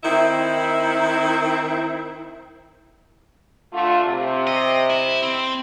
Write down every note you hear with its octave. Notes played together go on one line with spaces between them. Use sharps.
D#3 C4 E4
D3 A3 F4
C3
D#5
E4
C4